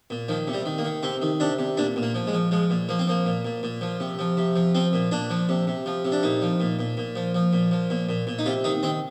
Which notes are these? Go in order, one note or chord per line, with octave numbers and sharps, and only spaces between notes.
A#2
D#3 F3
C3
G3
D#3
A#3
D#3
C3 C4
D#3
C3 D4
C3
A#2 D4
A#2
A#3
F3
G#3
F3
F3 G#3
A#2
F3 A#3
C4
F3 A#3
A#2
A#2
A#2
F3
C3
F3
C3
F3
F3 C4
A#2
A#2 D4
F3
C3
C3
F3
C3
D4
A#2 D#4
F3
A#2
A#2
A#2
F3
F3
A#2
F3
A#2
A#2
A#2
D#4
C3 F4
D#3 D#4
D#3 C4